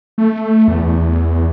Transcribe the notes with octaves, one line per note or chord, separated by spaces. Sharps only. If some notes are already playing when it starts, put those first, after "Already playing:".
A3
E2